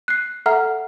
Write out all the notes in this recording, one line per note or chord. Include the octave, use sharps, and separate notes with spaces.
F#6 C7
A4 E5 F#5 A#5 F6